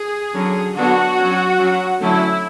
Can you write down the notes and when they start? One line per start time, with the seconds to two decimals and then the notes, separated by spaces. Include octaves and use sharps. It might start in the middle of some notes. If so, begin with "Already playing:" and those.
Already playing: G#4
0.33 D3 F#3 C#4
0.75 D3 F#3 B3 D4 F#4
1.18 F#3 C#4
1.59 F#3 C#4
2.00 D3 F#3 A3 C#4 E4